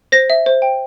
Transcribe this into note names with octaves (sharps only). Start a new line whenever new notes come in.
C5 A#6
E5
C5
G5